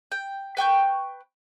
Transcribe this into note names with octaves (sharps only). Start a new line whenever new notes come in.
G5
B4 G5 C#6 G6